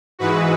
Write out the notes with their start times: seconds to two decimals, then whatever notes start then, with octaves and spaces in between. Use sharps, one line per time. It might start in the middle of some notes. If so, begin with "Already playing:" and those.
0.19 G#2 E3 G#3 F#4 B4